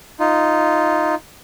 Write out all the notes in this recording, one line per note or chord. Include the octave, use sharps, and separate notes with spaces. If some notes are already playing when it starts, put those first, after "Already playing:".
D#4 F4